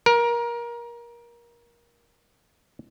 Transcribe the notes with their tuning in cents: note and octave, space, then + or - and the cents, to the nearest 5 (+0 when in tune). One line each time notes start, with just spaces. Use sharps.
A#4 +25